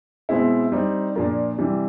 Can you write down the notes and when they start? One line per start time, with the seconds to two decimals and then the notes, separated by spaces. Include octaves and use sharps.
0.29 B2 G#3 C4 E4
0.72 G3 C4 D#4
1.15 A#2 F3 A#3 D4
1.58 C3 E3 G3